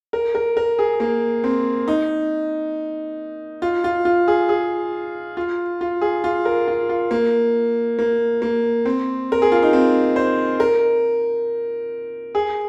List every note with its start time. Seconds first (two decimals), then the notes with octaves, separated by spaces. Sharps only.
0.13 A#4
0.35 A#4
0.57 A#4
0.79 G#4
1.00 A#3
1.44 C4
1.88 D#4
3.62 F4
3.84 F4
4.05 F4
4.28 G#4
4.49 G#4
5.37 F4
5.81 F4
6.01 G#4
6.24 F4
6.45 A#4
6.68 F4
6.89 F4
7.11 A#3
7.99 A#3
8.42 A#3
8.85 C4
9.32 A#4
9.42 G#4
9.52 F4
9.62 D#4
9.73 C4
10.16 C5
10.60 A#4
12.35 G#4